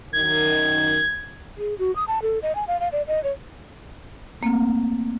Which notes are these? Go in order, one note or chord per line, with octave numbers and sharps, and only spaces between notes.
F#2 D#3 G#6
G#4
F#4
D#6
A5
A4
D#5
G#5
F5
F5
D5
D#5
C#5
A3 A#3 C4